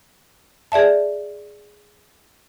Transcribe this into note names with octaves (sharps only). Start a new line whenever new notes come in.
G#4 D5 E5 A5